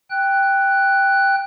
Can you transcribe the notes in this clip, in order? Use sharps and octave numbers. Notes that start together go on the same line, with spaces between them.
G5 F#6